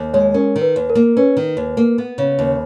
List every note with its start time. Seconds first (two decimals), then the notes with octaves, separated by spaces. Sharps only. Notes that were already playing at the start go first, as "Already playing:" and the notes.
Already playing: D#2
0.14 G#3 C#5
0.34 C#4 A#4
0.56 D#3
0.62 B4
0.76 D#2
0.90 A#4
0.95 A#3
1.17 C#4 B4
1.37 D#3
1.57 D#2
1.77 A#3
1.98 B3
2.18 C#3
2.39 D#2